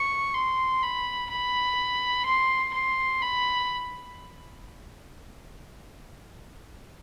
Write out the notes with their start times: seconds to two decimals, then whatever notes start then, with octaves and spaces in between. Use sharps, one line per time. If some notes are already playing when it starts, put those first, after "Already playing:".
Already playing: C#6
0.34 C6
0.83 B5
1.31 B5
2.26 C6
2.74 C6
3.22 B5